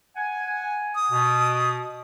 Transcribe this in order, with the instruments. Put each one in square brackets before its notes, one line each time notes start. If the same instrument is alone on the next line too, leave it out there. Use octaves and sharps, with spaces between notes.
[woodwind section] F#5 G#5
[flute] D#6
[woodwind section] B2